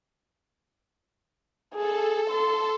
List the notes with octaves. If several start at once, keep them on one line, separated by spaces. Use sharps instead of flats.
G#4 A4
C6